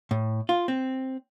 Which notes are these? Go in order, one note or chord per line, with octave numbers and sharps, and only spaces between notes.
A2
F4
C4